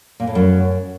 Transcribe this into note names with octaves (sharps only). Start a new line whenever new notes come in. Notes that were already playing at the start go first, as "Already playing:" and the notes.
A#2
A2
F#2